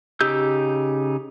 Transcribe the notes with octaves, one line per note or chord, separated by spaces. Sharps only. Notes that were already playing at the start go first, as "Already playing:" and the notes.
C#3 D#4 G4 E6 G6